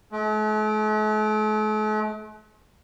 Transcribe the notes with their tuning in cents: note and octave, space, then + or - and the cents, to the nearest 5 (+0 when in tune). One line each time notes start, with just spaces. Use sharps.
A3 -45